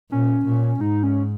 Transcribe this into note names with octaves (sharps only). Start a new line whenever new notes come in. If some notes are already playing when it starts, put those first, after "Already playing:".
A#2 C#4
A#2
G#2 D#4
C#4